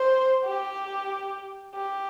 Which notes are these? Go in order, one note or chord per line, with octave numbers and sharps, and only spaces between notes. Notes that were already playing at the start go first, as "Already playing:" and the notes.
Already playing: C5
G4
G4